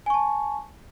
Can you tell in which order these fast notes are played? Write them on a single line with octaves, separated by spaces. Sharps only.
G#5 C#6 A5